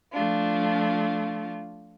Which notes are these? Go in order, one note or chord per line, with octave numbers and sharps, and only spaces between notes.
F3 A3 D4 F4